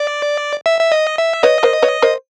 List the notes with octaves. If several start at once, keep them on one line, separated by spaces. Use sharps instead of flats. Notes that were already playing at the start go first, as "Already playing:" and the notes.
Already playing: D5
E5
E5
D#5
E5
B4 C#5 D#5
A#4 C5
B4 C#5
A#4 C5